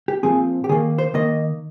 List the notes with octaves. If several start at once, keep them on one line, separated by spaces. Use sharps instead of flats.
G4
A#2 F3 C4 G#4
G4
D#3 A#3 G#4
C5
D#3 A#3 D#5